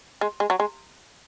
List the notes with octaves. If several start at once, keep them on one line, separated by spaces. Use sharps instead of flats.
G#3
G#3
F#3
G#3